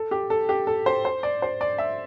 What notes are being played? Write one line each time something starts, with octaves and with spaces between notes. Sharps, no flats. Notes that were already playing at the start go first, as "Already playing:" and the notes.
Already playing: A4
G4
A4
G4
A4
C5
C5
D5
C5
D5
E5